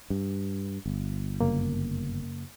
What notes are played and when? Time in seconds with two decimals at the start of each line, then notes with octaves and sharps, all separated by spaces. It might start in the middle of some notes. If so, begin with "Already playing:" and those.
0.10 G2
0.86 G1
1.41 F#2 C#3 A#3